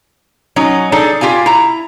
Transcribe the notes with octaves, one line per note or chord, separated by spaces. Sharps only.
F#3 C#4 D#4
D4 D#4 G#4 A4 D5
F4 G4 F5 G#5
E4 A#5